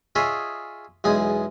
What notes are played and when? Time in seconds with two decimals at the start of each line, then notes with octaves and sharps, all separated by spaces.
0.16 F4 G#4 C#5 D#5 E5
1.04 B1 E2 G#3 G#5 D#6